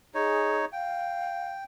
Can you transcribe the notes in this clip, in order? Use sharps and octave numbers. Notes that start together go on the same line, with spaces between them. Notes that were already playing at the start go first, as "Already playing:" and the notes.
D#4 G#4 C#5
F5 G5